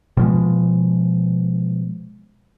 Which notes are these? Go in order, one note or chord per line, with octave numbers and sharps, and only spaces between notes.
B2 F3 G#3